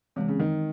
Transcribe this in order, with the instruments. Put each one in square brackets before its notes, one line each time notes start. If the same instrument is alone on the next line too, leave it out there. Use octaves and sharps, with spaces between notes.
[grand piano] C3 [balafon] E3 G#3 C4
[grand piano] C#3
D#3